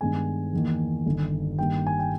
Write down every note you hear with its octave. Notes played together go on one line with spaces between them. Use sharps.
G2 D#3 G#3 B3 G#5
E2 D#3 A#3
G1 G2 D#3
G2 D#3 G3 A#3 G5
G#5
G5